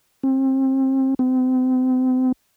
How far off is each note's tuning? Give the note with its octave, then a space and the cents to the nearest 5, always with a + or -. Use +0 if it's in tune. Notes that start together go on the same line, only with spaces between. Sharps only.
C4 +30
C4 -35